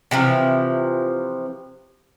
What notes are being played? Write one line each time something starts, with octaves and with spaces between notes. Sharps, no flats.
C3 E3 F3